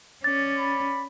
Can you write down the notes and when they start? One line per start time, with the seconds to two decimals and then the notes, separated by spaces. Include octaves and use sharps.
0.24 C#4 D5 A6
0.57 B5